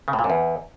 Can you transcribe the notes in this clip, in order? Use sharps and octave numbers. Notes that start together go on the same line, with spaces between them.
C#3
A2
A#2
F#2
E2